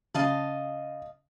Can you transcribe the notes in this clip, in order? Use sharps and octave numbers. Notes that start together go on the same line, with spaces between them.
C#3 D#5 F5 A5